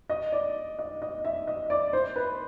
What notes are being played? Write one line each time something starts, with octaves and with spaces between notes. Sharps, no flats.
D#5
D5
D#5
D#5
E5
D#5
D5
C5
B4